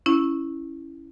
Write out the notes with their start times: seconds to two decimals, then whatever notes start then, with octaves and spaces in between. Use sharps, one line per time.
0.06 C#4 E4